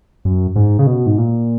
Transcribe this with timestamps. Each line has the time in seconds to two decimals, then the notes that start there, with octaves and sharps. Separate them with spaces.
0.25 F#2
0.56 G#2
0.79 C#3
0.87 B2
1.06 G#2
1.18 A#2